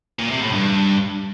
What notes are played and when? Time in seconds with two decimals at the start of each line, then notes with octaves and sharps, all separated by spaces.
0.19 A#2
0.31 C3
0.42 A2
0.53 G2